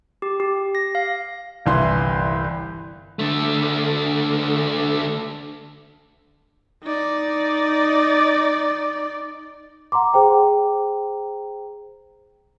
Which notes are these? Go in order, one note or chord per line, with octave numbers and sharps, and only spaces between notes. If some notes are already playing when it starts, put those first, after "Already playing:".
G4
G4
A#6
F5
G1 C2 E3 E5 C6
D3 A3
D#4 D5
F#5 A#5 C6 D6
G#4 C5 G5 A#5